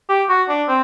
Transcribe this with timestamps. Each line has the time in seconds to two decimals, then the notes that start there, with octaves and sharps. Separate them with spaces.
0.09 G4
0.29 F#4
0.49 D4
0.68 C4